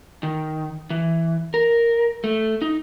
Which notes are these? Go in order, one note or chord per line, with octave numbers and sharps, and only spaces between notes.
D#3
E3
A#4
A3
D#4